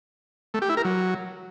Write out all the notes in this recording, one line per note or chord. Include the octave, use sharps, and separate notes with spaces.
A3
G4
E4
A#4
F#3